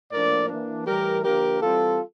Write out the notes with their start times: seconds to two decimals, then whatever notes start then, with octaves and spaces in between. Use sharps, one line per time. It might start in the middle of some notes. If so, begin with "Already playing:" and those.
0.12 A2 F3 A#3 D4 A#4 D5
0.49 E3 A#3 D4
0.87 A2 E3 G3 G4 A#4
1.23 D3 F3 A#3 D4 G4 A#4
1.61 E3 G3 C4 F4 A4